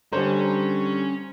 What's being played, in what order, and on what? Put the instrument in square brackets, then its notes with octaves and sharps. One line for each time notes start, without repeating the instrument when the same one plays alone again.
[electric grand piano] D3 G3 [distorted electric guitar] C#4 [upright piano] C5 A#5